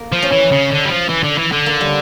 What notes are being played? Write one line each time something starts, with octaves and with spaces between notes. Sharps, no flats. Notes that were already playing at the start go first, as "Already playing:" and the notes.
Already playing: A#3
F3
C#4
E3
C#3
D3
G3
F3
E3
D3
E3
D3
A#3
G3